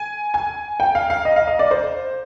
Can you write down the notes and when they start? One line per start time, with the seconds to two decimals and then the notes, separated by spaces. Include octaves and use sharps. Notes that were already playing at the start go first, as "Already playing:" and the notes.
Already playing: G#5
0.34 G#5
0.80 G5
0.95 F5
1.10 F5
1.25 D#5
1.36 F5
1.47 D#5
1.59 D5
1.71 C5